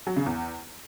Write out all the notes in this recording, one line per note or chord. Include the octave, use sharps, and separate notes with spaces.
F#3
C#3
E2